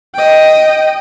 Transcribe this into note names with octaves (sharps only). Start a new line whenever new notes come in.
D#5 G5